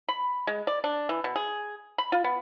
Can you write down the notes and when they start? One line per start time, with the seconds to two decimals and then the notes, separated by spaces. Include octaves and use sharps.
0.08 B5
0.47 G#3
0.67 D5
0.84 D4
1.09 E3
1.24 B2
1.36 G#4
1.98 B5
2.12 F4
2.24 B3